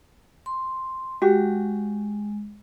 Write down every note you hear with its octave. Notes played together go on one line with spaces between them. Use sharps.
C6
G#3 F#4 G4